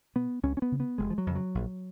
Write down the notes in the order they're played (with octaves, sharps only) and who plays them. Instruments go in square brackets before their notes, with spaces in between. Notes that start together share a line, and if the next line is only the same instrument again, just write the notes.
[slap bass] B2 B3
C#2 C#4
C#4
B3
C#3
B3
F1 G#3
F3
F#3
F2 C#3
F#3
A#1